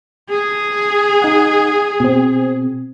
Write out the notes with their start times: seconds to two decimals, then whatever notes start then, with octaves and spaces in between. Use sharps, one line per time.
0.30 G#4
1.22 D#4 F#5
2.00 B2 C4